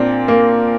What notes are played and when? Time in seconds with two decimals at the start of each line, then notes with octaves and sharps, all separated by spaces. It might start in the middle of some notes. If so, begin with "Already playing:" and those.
Already playing: A#2 C4 D4
0.28 A#3